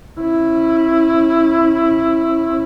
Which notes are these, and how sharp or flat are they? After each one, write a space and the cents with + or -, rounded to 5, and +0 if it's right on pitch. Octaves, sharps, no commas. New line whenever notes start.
C#4 -40 E4 +0